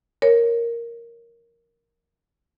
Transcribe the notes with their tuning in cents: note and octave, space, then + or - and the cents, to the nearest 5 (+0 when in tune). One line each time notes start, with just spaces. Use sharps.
A#4 +0 C#5 +0